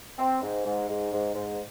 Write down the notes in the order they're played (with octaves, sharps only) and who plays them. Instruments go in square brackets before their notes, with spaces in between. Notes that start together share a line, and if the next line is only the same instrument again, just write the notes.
[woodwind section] C4
G#2
G#2
G#2
G#2
G#2